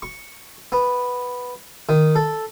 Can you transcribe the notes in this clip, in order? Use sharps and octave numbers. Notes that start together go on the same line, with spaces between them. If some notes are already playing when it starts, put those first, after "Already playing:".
C#6
B3
D#3
A4